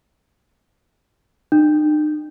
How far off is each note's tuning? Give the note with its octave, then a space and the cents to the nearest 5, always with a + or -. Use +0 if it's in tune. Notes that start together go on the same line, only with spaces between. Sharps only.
D#4 -45